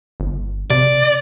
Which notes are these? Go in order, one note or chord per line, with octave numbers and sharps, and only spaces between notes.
G1
C3 D5